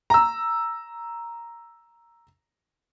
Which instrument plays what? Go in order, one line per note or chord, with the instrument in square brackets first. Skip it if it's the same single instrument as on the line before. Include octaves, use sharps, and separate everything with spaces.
[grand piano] A#5 E6